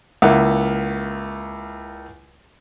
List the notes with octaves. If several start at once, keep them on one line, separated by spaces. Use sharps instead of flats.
C#2 A#3 E4 F#5